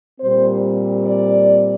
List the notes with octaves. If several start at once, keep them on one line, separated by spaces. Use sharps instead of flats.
A#2 G3 C4 C5
D5